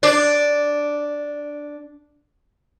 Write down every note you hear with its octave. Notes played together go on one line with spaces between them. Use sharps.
D4 D5